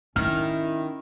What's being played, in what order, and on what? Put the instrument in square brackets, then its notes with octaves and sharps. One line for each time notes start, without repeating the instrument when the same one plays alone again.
[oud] D#3 [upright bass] C#4 [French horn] E4 [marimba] F6